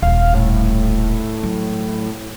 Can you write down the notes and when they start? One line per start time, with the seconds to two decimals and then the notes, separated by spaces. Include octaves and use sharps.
0.02 D#1 C2 F5
0.34 A2
1.43 F#3